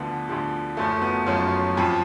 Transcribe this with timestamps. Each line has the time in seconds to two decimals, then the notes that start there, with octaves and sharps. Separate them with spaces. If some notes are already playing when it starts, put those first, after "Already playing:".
Already playing: D2 D3 F3 B3
0.28 D2 D3 F3
0.76 F#1 F#2 F3 A3
1.02 B3
1.26 F#1 F#2 F3 C#4 F4
1.77 F2 F3